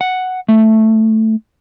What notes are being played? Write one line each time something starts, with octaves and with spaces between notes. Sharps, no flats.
F#5
A3